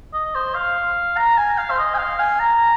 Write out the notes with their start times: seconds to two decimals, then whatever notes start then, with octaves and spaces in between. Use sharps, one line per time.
0.14 D#5
0.35 C5
0.55 F5
1.17 A#5
1.37 G#5
1.58 F5
1.70 C5
1.78 D#5
1.94 G#5
1.98 F5
2.19 G#5
2.40 A#5